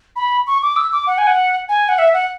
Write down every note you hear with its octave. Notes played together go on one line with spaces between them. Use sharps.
B5
C#6
D6
E6
D6
F#5
G#5
F#5
G#5
F#5
E5
F#5